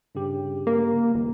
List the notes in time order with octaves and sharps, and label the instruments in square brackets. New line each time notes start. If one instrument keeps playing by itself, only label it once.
[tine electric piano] G2 C#3 G4
[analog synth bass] A#3
D#1